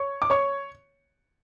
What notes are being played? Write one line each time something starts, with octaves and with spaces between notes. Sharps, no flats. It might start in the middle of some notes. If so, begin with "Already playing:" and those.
Already playing: C#5 C#6
D6
C#5 C#6